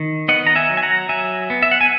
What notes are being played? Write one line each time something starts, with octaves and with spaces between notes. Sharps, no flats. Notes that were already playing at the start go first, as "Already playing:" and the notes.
Already playing: D#3
B3 D#5 F#5
A#5
E5 G#5
F#3
G#5
F#5 A#5
F#3 E5 G#5
B3
E5
F#5
G#5